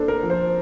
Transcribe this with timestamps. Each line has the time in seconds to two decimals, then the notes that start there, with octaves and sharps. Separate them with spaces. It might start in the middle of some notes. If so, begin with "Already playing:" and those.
Already playing: A#3 D4 A4 C5
0.08 A#4
0.23 F3
0.30 C5